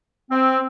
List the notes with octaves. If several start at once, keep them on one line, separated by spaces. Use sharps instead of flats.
C4